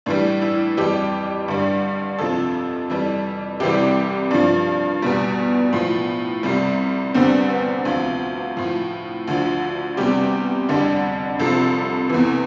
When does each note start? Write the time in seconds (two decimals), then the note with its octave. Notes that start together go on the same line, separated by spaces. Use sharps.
0.06 A2 E3 G3 D4
0.42 E4
0.77 F2 E3 G3 G4
1.48 G2 D3 G3
2.19 F2 C3 F3 A4
2.90 F2 E3 G3
3.60 C2 C3 E3 G3 G4
4.31 G2 F3 D4
5.02 E2 B2 G3
5.73 A2 F3
6.43 C2 C3 G3
7.14 E2 D3 G3 C4
7.50 B3
7.85 D2 C3 F3 F4
8.57 A2 F3
9.28 D2 D3 F3
9.97 E2 C3 G3 G4
10.68 F2 D3 G3
11.39 C2 C3 F3 A4
12.10 E2 C3 E3